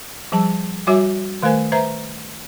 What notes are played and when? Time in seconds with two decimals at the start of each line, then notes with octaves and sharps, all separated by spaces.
0.32 F3 G3 G#4 A5
0.87 G3 F#4 C#5 E5 G#5 D6
1.43 D#3 A3 A#4 C5 G#5
1.72 B4 C5 E5 A#5